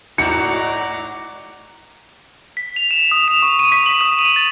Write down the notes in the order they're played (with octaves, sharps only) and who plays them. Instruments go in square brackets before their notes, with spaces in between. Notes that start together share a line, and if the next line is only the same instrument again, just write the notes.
[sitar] G#2 D#4 F#4 [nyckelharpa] D5 A#5 [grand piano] C#7
[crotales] B6
F7
E7
D#6
E7
C#6
D#7
B6
F#7
D#6
D#7
A6